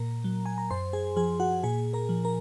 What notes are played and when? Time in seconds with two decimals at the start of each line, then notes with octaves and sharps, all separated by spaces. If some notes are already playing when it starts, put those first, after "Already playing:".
Already playing: A#2 A#4 A#5
0.24 F#3
0.46 G#5
0.58 A#5
0.71 F#2 C5 C6
0.93 G#4 G#5
1.16 F3 G#4 G#5
1.40 F#4 F#5
1.63 A#2 G#4 G#5
1.93 A#4 A#5
2.09 F3
2.25 A#4 A#5